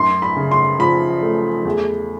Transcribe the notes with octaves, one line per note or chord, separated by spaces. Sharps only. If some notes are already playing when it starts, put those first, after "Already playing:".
Already playing: F#2 C6
B5
C#3
C6
F3 B5
A3
E2